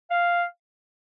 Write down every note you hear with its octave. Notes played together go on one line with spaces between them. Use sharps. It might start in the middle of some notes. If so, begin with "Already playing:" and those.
F5